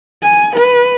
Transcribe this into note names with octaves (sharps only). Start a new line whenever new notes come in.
G#5
B4